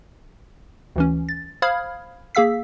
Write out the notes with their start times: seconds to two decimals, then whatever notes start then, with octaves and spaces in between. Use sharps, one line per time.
0.96 D2 E3 C#4
1.29 A6
1.62 C5 F5 B5 D#6 F6 G#6
2.35 A#3 G#4 F5 E6 B6